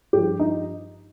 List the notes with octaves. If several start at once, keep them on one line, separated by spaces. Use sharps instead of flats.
G2 F3 G4
D#4